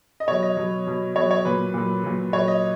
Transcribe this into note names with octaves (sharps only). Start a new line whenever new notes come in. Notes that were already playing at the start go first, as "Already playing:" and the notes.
D#5
B2 F#3 C#5
D#5
B2 F#3
B2 F#3
B2 F#3 C#5
C#5
A#2 F#3 B4
A#2 F#3
A#2 F#3
A#2 F#3 C#5
D#5